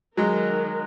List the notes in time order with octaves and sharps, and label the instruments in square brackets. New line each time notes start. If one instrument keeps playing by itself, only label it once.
[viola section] D#3 A#4 [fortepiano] F#3 G#3